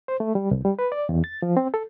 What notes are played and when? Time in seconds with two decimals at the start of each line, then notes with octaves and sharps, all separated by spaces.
0.08 C5
0.20 A3
0.35 G3
0.51 C2
0.65 G3
0.79 B4
0.92 D5
1.09 E2
1.24 A6
1.42 F3
1.57 C4
1.74 A4